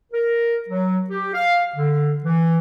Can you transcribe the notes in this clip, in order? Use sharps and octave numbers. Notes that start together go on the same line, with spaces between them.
A#4
F#3
G4
F5
D3
E3